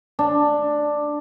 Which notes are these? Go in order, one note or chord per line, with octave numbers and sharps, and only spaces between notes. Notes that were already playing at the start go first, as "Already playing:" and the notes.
D4